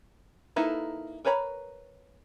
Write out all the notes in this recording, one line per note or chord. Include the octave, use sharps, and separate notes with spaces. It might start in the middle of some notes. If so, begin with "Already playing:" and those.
A#3 D#4 E4 A4 B4
A#4 B4 C#5 A#5 B5